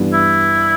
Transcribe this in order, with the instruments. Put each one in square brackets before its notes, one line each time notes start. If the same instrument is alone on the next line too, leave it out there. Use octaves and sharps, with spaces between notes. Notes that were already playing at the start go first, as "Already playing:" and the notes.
Already playing: [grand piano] G2 E3 B3
[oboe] E4